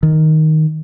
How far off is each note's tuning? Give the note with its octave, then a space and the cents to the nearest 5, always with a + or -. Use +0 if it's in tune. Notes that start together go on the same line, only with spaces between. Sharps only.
D#3 +5